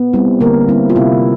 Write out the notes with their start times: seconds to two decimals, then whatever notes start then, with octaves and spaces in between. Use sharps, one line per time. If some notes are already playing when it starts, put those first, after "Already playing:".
Already playing: B3
0.13 G3 C4 E4
0.41 D3 A#3 A#4
0.68 G3 C4 E4
0.90 F4
0.96 C3 E4